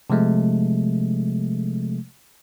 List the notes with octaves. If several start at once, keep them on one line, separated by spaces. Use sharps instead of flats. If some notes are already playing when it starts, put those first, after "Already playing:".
C3 F3 G#3 A3